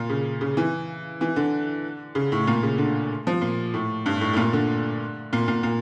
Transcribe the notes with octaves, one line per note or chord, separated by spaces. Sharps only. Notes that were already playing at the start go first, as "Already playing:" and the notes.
Already playing: A#2
C#3
C#3
E3
E3
D3
C#3
A2
A#2
C#3
D3
F3
A#2
A2
G2
A2
A2
A#2
D3
A#2
A#2
A#2